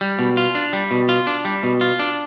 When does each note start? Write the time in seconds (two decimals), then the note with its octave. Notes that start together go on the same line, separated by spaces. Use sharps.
0.01 G3
0.19 B2
0.37 F4
0.55 D4
0.73 G3
0.91 B2
1.09 F4
1.27 D4
1.45 G3
1.63 B2
1.81 F4
1.99 D4